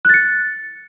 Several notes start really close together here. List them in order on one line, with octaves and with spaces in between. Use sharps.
F#6 A6 C#7